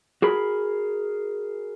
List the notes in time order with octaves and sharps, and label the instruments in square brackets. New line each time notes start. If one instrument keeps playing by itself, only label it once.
[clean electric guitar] F#4 G#4 A#4 B5